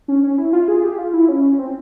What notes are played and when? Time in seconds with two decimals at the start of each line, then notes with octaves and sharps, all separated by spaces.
0.08 C#4
0.23 C#4
0.38 E4
0.53 F4
0.68 G#4
0.83 G4
0.98 F4
1.14 E4
1.29 C#4
1.59 C4